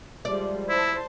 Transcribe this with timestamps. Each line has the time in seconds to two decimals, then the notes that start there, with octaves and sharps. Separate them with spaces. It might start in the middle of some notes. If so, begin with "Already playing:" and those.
0.25 F3 G3 G#3 D5
0.69 E4 C5 A5